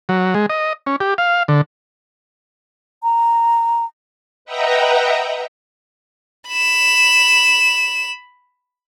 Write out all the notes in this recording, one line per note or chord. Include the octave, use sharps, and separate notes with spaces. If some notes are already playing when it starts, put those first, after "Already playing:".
F#3
G#3
D#5
C#4
G4
F5
D3
A#5
B4 D#5 E5 F#5 G5 A#5
B5 E7